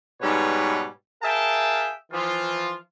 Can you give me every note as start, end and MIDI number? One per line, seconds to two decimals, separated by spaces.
0.22 0.86 44
0.22 0.86 47
0.22 0.86 55
0.22 0.86 71
0.22 0.86 73
1.22 1.90 68
1.22 1.90 70
1.22 1.90 76
1.22 1.90 77
1.22 1.90 79
1.22 1.90 81
2.12 2.75 52
2.12 2.75 53
2.12 2.75 65